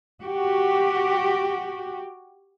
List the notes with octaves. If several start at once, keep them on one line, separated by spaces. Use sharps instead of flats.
F#4 G4